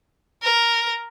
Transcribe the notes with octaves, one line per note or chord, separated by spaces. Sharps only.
A#4